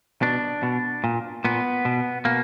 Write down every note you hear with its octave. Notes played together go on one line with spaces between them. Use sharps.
B2 D4
B2
A#2
A#2 B3
B2
B2 A#3